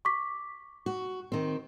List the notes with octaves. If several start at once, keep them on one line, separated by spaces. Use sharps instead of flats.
C#6 D6 B6
F#4
D#3 C4